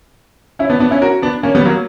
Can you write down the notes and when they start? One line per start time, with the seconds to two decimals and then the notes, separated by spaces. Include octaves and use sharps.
0.59 C#4 E4
0.70 B3 D4
0.80 B3 D4
0.91 C#4 E4
1.02 F#4 A#4
1.22 B3 D4
1.43 A#3 C#4
1.55 G3 B3
1.65 F#3 A#3